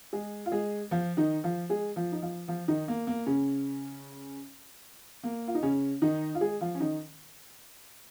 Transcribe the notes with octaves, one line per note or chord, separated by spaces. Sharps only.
G#3 G#4
F4
G#3 G#4
F3 F4
D#3 D#4
F3 F4
G#3 G#4
F3 F4
D#4
F3 F4
F3 F4
D#3 D#4
A#3
A#3
C#3 C#4
A#3
F4
D#4
C#3 C#4
D#3 D#4
F4
G#3 G#4
F3 F4
C#4
D#3 D#4